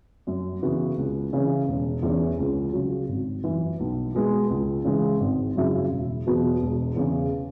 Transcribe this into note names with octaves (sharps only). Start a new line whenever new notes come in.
F#2
C#3 E3 B3 F#4
C#2
C#3 E3 C#4
E1
E2 E3 C#4
C#2
C#3 F#3
G#1
F#2 E3
B1
B2 G#3 B3
C#2
C#3 E3 G#3
G#1
F#2 C#3 F#3 E4
E1
E2 B2 F#3 B3
E1
E2 C#3